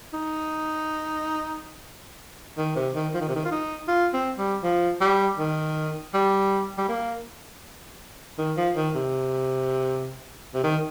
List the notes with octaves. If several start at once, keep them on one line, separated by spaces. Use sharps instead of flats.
D#4
D#3
C3
D#3
F3
D#3
C3
D#3
F4
D#4
F4
C4
G3
F3
G3
D#3
G3
G3
A#3
D#3
F3
D#3
C3
C3
D#3